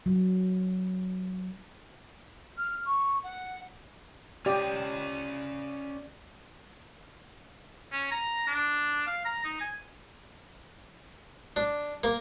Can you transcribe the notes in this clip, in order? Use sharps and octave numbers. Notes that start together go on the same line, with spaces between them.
F#3
F6
C#6
F#5
C#4 G4 D5 D#5
C#4
A#5
D4
F5
A#5
D#4
G#5
D4
A#3